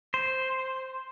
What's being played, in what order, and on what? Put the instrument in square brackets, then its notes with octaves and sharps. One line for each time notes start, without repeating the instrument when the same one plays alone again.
[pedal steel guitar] C5